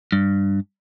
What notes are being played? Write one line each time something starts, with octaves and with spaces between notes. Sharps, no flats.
G2